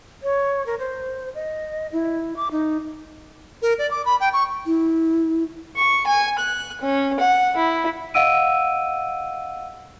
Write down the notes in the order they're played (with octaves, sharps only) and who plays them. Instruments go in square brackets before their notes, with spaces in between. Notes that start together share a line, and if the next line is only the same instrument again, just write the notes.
[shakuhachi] C#5
A#4
C5
D#5
E4
D6
D#4
[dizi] A#4
D5
D6
B5
G5
C#6
[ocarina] E4
[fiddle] C#6
G#5
F#6
C#4
F#5
E4
[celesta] D#5 F5 F#5 E6 D7 D#7